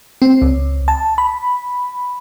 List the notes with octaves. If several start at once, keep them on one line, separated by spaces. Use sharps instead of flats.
C4
C#2
A5
B5